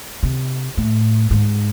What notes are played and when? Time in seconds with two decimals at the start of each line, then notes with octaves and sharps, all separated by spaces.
0.23 C3
0.77 A2
1.31 G#2